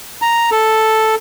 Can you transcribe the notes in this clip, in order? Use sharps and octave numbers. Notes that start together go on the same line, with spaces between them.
A#5
A4